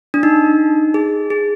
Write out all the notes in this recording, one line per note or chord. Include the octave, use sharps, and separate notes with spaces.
D4
D#4
G#4
G#4